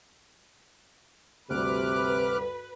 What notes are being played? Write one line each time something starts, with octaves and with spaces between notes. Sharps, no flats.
D2 G2 C3 B4 D6 F6 F#6